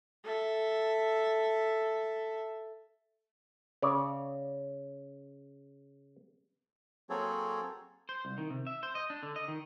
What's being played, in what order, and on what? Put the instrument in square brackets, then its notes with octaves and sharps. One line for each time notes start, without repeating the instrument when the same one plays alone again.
[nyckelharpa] A4 E5
[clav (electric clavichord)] C#3 C#5 D5
[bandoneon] F#3 A#3 C4 G#4 A4 C#5
[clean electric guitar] C5
C2
D#3
C3
E5
C5
D#5
D4
D3
D#5
D#3